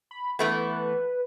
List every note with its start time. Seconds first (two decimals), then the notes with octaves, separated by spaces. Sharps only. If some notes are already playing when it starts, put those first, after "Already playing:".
0.11 B5
0.39 E3 A3 B3 B4